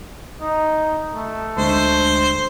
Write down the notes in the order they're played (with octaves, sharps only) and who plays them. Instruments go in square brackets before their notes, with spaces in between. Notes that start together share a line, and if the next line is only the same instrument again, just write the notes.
[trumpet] D#4
A3
[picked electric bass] D2 G#3 D4 [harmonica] C5